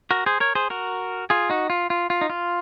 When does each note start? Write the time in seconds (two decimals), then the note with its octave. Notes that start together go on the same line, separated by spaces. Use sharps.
0.11 F#4 A#4
0.26 G#4 C5
0.40 A#4 C#5
0.55 G#4 C5
0.70 F#4 A#4
1.30 F4 G#4
1.50 D#4 F#4
1.70 F4
1.90 F4
2.10 F4
2.21 D#4
2.30 F4